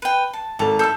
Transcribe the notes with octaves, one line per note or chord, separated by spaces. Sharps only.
B4 G5
A5
G#1 A4 A5 F7
A4 E5 A5 E6 G6